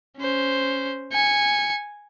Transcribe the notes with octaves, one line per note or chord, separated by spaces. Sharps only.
C#4 C5
G#5 C#7